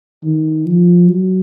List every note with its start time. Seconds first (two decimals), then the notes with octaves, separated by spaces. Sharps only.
0.23 D#3
0.66 F3
1.08 F#3